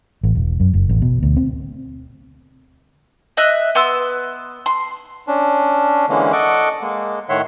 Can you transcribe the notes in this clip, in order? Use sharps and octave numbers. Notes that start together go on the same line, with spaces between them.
A1
E1
F#2
F#1
A1
B2
D2
C4
D#5 E5 F#6
B3 C6 E6
C6
C#4 D4
D3 E3 G#3 A#3 C#4
A4 D#5 F#5 C#6 D6
G#3 A#3
A2 D#3 C#5 E5 F#5 C6